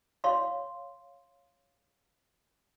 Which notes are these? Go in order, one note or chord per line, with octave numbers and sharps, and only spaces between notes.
C#5 F5 C6